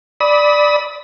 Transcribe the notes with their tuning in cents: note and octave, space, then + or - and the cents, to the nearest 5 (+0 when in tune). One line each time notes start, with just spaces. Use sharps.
D5 +5 B5 +0 D#6 +40